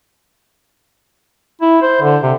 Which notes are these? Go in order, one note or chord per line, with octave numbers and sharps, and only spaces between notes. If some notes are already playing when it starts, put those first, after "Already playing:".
E4
C5
D3
C3